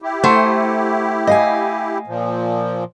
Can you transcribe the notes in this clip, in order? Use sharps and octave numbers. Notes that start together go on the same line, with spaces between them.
E4 G4
A3 C5 F#5
D#5 F5 G#5
A#2 F3